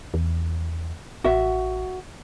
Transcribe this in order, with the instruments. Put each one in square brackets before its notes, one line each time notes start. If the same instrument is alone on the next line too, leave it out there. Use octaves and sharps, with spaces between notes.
[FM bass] E2
[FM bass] A1 [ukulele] F#4 E5